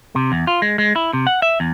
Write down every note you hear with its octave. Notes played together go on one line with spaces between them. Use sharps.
C3
E2
F4
G#3
G#3
E4
C3
F#5
E5
E2